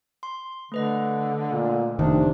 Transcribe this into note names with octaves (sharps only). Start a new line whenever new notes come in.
C6
D3 A3 B4 D#5
A#2
F1 C3 D#3 D4